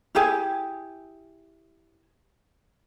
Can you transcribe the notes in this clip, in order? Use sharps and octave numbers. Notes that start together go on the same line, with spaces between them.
E4 G4 G#4 G#5